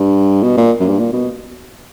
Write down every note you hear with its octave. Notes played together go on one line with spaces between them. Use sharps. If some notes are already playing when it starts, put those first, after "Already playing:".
Already playing: G2
B2
A#2
F#2
G2
A#2
B2